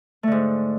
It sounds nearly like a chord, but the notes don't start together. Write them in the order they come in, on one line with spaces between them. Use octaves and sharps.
A3 D3 G#2